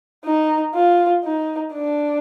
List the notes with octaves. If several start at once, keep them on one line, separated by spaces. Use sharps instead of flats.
D#4
F4
D#4
D4